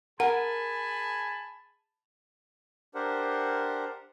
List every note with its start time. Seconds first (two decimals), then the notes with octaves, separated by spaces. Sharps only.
0.20 G#4 A#4 F#5 G#5 A5 B5
2.95 D4 G4 A#4 C5 F#5